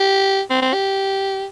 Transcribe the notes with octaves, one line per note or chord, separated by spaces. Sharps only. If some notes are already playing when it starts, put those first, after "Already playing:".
Already playing: G4
C4
C4
G4